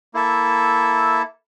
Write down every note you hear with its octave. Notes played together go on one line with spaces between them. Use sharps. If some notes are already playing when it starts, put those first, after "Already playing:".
A#3 E4 A4 E5